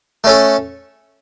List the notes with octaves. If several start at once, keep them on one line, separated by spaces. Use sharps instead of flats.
A3 C#4 A4